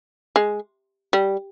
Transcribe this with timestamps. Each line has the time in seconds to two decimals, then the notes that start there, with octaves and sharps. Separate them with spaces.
0.36 G#3
1.13 G3